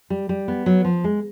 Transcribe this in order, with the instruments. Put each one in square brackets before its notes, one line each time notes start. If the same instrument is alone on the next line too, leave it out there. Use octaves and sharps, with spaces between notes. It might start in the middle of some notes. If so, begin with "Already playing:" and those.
[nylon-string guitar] G3
G3
B3
F#3
F3
G#3